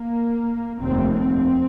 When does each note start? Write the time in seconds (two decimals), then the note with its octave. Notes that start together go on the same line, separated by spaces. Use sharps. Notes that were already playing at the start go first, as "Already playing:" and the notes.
Already playing: A#3
0.82 F1 D#2 C4
1.17 C4